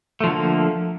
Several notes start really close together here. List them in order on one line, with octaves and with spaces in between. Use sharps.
A3 F3 D3 A#3